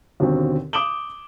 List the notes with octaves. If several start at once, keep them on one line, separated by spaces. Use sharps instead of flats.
D#2 B2 D3 C4
D6 D#6 D7 E7 F#7 G7